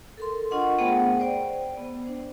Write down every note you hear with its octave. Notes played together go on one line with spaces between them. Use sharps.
A4 A#4 C6
D4 F4 A#4 D#5 F#5 C#6
A3 B3 G#4 C5 F#5 G5
C5 D5 G5
B3
D4 C5